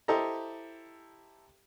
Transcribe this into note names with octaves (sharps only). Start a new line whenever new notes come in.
E4 G4 A4 C5 D#5 A#5